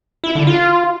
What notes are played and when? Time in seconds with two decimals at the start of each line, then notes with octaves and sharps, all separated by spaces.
0.24 E4
0.35 D3
0.47 F4